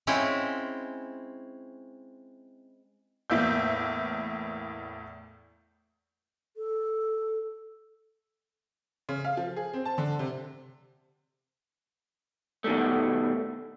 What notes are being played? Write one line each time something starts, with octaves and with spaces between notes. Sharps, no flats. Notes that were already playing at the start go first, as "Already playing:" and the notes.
G#3 C4 C#4 E4 F4
E2 A2 A#3 E5 G6
A4
C#3
F5
F3
G#4
C4
A5
D3
C3
B2 D#3 G3 A3